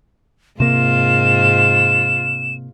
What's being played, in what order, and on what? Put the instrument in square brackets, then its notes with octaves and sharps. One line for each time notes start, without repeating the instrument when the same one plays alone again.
[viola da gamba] G#2 F4 [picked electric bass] C3 A#3 [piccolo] E7